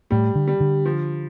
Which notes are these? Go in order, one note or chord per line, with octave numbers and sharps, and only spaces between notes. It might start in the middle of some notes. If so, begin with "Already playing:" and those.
A2 G3
D3
G3
D3
F3